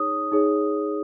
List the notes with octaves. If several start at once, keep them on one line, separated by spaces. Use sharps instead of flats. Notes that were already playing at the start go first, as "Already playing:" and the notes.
Already playing: D#4 G#4 C#5 D#6
D#4 G#4 C#5